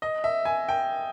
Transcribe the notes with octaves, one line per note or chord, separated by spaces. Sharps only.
D#5
E5
G#5
G5